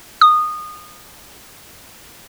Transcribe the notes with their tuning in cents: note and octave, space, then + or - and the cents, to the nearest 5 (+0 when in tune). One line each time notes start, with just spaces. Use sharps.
D#6 -20